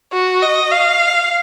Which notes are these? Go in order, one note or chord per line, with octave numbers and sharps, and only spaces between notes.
F#4
D#5
F5